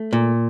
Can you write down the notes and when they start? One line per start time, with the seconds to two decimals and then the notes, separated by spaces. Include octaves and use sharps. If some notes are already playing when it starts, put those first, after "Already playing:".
Already playing: A3
0.13 A#2